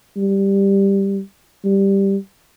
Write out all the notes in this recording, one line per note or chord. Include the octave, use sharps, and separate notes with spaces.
G3
G3